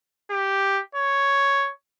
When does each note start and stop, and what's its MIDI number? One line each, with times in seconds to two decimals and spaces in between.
0.31 0.81 67
0.95 1.71 73